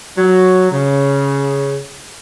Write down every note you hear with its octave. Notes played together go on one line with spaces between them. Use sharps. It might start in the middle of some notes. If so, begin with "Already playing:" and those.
F#3
C#3